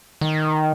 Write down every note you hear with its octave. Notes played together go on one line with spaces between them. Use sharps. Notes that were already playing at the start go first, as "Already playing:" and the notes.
D#3